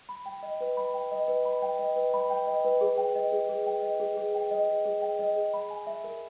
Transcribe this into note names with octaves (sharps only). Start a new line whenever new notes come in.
B5
G5
D#5
B4
B5
G5
D#5
B4
B5
G5
D#5
B4
B5
G5
D#5
B4
G#4
G5
D#5
G#4
G#4
G5
D#5
G#4
G#4
G5
D#5
G#4
G#4
G5
D#5
G#4
B5
G#5
E5
A#4